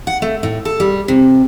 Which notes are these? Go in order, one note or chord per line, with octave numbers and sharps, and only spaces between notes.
F#5
A3
A2
A4
G3
C3